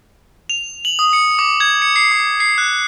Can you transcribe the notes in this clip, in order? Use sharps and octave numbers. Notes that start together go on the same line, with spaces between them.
F7
F#7
D#6
C#7
D6
G#6
C#7
C7
D6
C7
F#6